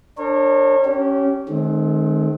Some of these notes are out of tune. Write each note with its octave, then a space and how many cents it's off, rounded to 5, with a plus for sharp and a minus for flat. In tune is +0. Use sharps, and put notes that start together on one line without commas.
D4 +0 A#4 -35 C#5 -40
C#4 +0 G4 -25
D#3 -20 G#3 +45 C4 +15